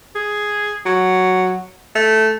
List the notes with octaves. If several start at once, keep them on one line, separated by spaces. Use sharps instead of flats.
G#4
F#3
A3